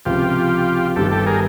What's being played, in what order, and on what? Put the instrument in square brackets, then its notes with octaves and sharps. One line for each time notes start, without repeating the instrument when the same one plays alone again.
[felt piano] C#2 C3 F3 [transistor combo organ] F4 G4
[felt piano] G1 G2 D#3 G3 [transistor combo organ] G4 A4
[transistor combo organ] G4 A4
G#4 A#4